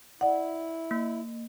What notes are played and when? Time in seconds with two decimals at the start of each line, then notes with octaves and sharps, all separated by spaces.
0.21 E4 D5 F#5
0.91 A#3